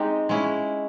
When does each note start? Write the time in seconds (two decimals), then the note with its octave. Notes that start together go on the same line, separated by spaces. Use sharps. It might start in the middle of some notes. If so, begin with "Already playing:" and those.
Already playing: G#3 C4 D#4 G4
0.29 G#3 C#4 E4